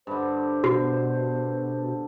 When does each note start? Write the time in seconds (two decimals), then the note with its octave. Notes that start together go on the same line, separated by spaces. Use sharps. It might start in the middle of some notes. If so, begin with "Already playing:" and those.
0.07 G2 D3 C5
0.64 B2 F#4